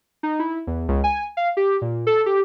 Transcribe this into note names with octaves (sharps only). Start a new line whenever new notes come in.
D#4
E4
E2
C#2
G#5
F5
G4
A#2
A4
G4